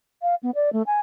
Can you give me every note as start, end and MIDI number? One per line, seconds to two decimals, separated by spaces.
0.22 0.35 77
0.43 0.51 59
0.55 0.72 74
0.73 0.82 57
0.87 1.00 80